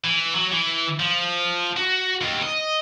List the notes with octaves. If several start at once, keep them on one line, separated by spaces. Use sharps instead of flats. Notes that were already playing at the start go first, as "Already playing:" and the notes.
E3
F#3
E3
F3
F#4
D#2
D#5